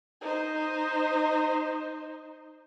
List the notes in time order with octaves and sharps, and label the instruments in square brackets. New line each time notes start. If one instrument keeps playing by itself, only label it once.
[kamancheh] D#4 C5